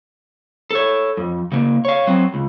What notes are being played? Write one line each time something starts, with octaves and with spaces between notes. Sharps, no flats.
A4 C#5
F2
C#3 A#3
C#5 F5
F#3 C4
C#2